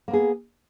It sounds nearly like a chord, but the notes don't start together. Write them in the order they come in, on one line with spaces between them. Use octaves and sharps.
A#3 B3 G#4